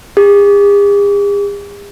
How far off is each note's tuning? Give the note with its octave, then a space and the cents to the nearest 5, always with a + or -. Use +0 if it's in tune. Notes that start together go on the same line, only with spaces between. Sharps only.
G#4 -45